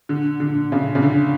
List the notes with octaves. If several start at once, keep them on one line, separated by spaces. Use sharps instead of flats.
D3
D3
C#3
C#3
D3